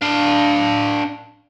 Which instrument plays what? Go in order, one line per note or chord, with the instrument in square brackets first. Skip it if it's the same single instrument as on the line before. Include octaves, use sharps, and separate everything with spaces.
[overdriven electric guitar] D4 F5